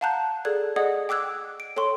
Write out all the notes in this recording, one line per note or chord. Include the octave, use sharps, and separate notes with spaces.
F5 F#5 A5 A#5 F#6 G6
G#4 A4 D5 F#6 G#6
G#4 D5 D#5 F#5 D#6 G#6
G5 D6 E6 F#6 G#6
D7
A4 C#5 G5 C6 C#6